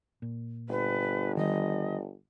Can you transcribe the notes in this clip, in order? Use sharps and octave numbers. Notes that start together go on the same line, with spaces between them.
A#2
G1 B4
D#3 G3 D#5